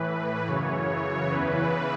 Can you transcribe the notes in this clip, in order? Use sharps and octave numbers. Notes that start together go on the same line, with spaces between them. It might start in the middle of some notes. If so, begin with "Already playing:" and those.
Already playing: A2 E3 B4
F#2 C#3 E3 C#5
E2 C#3 E3 B4